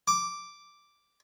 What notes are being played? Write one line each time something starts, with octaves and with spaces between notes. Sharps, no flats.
D6